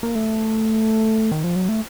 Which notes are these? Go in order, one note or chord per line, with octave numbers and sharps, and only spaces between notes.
A#3
A3
D#3
F3
F#3
A3